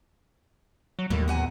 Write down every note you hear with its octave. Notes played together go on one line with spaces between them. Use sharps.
F#3
D#2 A2 G3 A#3
E2 F#5 G#5